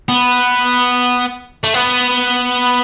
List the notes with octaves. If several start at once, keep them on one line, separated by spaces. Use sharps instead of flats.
B3
A3
B3